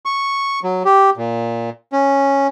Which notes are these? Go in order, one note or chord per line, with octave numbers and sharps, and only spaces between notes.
C#6
F#3
G4
A#2
C#4